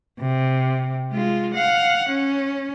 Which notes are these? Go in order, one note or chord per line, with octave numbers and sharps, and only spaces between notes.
C3
G#3 F4
F5 F#5
C#4